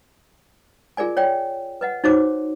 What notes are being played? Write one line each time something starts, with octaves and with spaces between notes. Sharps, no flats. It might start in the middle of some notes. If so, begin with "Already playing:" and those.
F4 G#4 A#4 D5 G#5
C#5 D5 G5
B4 D#5 F#5
D#4 F#4 C5 C#5 D6